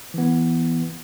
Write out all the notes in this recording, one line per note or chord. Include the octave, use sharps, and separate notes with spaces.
E3 B3